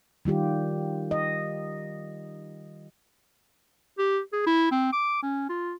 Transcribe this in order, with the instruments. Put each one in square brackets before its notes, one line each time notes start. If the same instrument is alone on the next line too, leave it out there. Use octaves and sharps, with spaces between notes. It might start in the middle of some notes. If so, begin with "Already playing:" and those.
[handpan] D#3 G3 F4 G4
D#5
[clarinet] G4
G#4
E4
C4
D6
C#4
F4